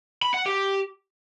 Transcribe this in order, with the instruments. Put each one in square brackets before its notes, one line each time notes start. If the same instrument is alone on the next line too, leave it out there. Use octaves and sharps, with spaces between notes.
[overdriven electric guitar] B5
F#5
G4